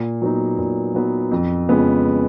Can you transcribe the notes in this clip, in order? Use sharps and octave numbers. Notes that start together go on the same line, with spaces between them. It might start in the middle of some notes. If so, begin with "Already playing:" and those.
Already playing: A#2
F#3 B3 D#4
A#2
F#3 B3 D#4
F2
C#3 F3 G#3 B3